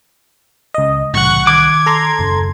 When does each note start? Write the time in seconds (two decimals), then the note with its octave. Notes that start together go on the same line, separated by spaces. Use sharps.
0.74 C#2 D#5
1.14 C2 A2 C#3 E3 F#5 C#6 F#6
1.47 D#3 D6 G#6
1.86 A4 A#5 C6
2.19 D#1 F#2 C#3